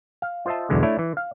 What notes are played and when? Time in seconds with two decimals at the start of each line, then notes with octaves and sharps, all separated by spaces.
0.22 F5
0.46 F4 C5 D#5 E5 A5
0.70 B1 E2 B2 D3 G#3
0.83 A3 D4 E4 C#5
0.99 E3
1.17 F5